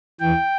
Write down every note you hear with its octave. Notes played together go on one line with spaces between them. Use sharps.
E2 E3 G5